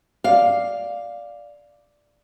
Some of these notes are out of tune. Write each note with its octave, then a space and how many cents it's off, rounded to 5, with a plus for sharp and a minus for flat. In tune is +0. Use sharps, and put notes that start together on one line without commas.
D5 +0 F5 +0